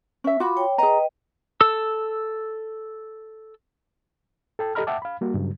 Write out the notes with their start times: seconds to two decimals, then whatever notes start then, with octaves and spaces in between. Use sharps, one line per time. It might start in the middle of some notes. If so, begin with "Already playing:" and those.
0.24 C#4 E5
0.40 F4 F#4 B5 D6
0.57 C#5 G5
0.78 G#4 B4 D#5 G5 A#5
1.61 A4 E6
4.59 A4 G5 A5
4.75 G4 A4 D#5 A#5 B5 F6
4.87 E5 F#5 G5 A5 D6
5.02 F5 B5
5.21 G3 A#3 F#4
5.34 G2 C#3 F#3